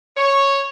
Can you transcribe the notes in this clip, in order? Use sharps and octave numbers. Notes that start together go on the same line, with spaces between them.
C#5